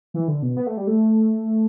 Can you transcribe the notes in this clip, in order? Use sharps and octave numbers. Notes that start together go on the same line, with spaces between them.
E3
D3
B2
B3
A3
G3
A3